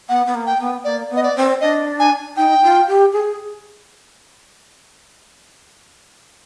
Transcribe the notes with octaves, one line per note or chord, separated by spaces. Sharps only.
B3 F#5
B3
A#3
G5
B3
A#3 D5
B3
D#5
D5
C4
D4 D#5
G#5
D#4 G5
F4
G4
G#4